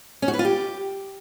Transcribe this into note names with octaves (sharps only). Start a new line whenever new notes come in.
C#4
F#4
B4
F4
G4